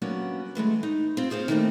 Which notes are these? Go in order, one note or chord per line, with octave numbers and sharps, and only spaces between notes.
F#3 G3 A#3 B3 C#4 D4
E3 G#3 A3 B4
D#4
C4 F4
F4 G#4 C5 C#5 F5
D#3 E3 A3 A#3 C4 D#4